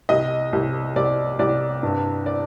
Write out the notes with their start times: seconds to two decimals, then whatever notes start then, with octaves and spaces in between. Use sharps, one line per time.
0.09 C2 D#5
0.53 C2
0.96 C2 D5
1.39 C2 D5
1.83 G2
2.26 D5